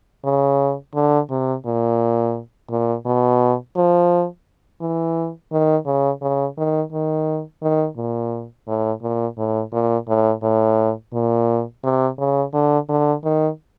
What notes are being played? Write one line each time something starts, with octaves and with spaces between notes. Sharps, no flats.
C#3
D3
C3
A#2
A#2
B2
F3
E3
D#3
C#3
C#3
D#3
D#3
D#3
A#2
A2
A#2
A2
A#2
A2
A2
A#2
C3
C#3
D3
D3
D#3